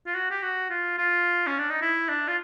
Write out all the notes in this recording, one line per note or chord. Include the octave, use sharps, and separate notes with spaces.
F4
F#4
G4
F#4
F4
F4
C#4
D4
D#4
E4
D4
F4